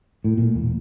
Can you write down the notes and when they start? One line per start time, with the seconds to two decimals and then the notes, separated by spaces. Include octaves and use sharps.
0.24 A2
0.37 A#2
0.55 E1